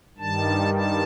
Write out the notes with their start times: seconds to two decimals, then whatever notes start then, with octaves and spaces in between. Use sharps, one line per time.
0.18 G2 D#3 G3 A5
0.74 A5